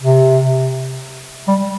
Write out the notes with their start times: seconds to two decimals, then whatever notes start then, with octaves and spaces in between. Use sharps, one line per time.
0.02 C3
1.48 G3